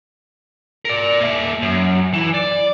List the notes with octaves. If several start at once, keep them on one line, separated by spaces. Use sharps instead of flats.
A#4 D5
A#3 E5
F#2
E3
D5